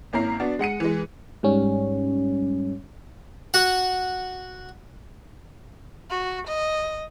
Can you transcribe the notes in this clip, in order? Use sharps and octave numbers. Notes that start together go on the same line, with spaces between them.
G#1 A#3 C#4 E4 A#5 C7
B3 D4 F#4
G#3 F#5 C#7 D#7
E3 G#3
G#2 G3 C#4
F#4 F#5
F#4
D#5